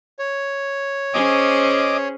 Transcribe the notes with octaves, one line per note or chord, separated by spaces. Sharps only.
C#5
C#4 G#4 C5 D#5 D6